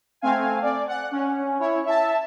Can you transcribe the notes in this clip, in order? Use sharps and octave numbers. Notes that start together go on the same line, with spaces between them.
A3 C4 F5 G#5
D5
F#5
C#4
E4 C#5
E5 A5